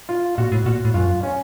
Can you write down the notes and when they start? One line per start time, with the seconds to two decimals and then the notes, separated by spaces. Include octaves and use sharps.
0.09 F4
0.38 A#2 F#4
0.52 A2
0.66 A#2 F#4
0.85 A2
0.94 F#2 F4
1.23 C#4